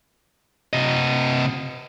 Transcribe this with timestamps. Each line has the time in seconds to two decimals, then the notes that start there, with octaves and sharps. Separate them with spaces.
0.73 C3 D#5